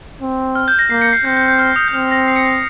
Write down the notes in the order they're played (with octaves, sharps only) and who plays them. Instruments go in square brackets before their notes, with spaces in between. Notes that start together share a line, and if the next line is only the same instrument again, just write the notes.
[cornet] C4
[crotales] F6
G6
A#6
[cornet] A#3 [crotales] C7
[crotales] A#6 C#7
C7
[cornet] C4 [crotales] G6
[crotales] G6
G6
F6
D#6
G6
[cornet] C4 [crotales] F6
[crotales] A#6
C7
C#7
C7